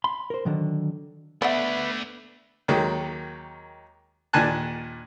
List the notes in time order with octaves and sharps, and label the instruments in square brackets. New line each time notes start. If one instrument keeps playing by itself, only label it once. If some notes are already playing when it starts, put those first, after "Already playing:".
[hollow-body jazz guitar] B5 C6
A#4 C5
D3 D#3 F#3
[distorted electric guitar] A3 D4 [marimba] B3 E5 [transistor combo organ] B4 [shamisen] D5 F#5
[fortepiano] D#2 D#3 F#3 G#3 A#3
D#2 A#2 D4 G#5 A5 F#6